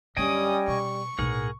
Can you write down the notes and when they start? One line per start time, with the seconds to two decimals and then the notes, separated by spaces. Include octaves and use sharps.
0.17 F#2 D3 G3 C#4 D#5 G5 G#5 D#6
0.68 B2 C#6
1.19 B1 A2 G#4 A#4 F#5